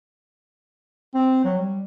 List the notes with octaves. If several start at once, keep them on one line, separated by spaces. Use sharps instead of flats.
C4
F#3
G3